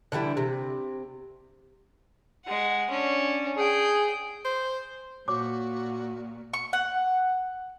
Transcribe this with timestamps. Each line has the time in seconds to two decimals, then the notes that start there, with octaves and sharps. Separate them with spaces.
0.12 D3 E3 G3 E4
0.37 C3
2.45 G#3 F#5
2.90 C#4 D4
3.58 G#4 G5
4.45 C5
5.28 A#2 F#4 C#5 D6
6.53 C#6
6.73 F#5